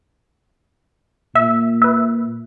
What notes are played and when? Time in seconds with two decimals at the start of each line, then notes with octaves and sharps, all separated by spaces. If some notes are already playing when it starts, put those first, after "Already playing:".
1.35 A#2 E5
1.82 B4 E5